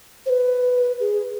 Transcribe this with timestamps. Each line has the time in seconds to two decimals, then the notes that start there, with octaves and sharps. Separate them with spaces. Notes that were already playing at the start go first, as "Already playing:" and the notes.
0.26 C5
0.30 B4
1.00 G#4